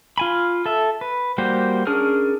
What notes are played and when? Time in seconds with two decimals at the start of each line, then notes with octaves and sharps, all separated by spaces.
0.18 F4 G#5 B5
0.66 A4 E5
1.01 B4
1.38 G3 A#3 F#4 G4 C5
1.87 C#4 D4 G#4 A#4 F6